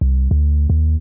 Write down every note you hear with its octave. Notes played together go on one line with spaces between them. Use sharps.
C2
D2
D#2